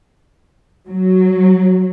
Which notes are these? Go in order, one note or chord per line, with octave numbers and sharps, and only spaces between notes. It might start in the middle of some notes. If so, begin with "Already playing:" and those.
F#3